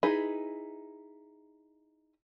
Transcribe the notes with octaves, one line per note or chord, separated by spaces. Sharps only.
D#4 E4 G#4 B4 B5